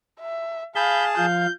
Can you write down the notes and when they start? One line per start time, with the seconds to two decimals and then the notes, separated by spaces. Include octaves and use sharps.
0.20 E5
0.75 G#4 F5 A5 B5 G6
1.17 F3 F5 G6